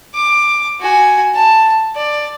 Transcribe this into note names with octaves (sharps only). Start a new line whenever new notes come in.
D6
F#4 G#5
A5
D5